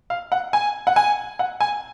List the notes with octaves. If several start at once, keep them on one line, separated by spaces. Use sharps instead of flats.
F5
F#5
G#5
F#5
G#5
F#5
G#5